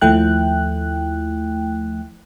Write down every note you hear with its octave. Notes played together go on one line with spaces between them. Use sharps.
D#2 F3 A3 E4 G5 F#6